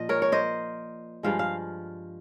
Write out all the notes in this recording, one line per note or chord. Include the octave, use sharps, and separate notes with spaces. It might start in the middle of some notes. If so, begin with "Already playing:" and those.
Already playing: A#2 F3 D#5
A#4 C#5
C#5
C5 D#5
G2 F3 G#3 F5
F5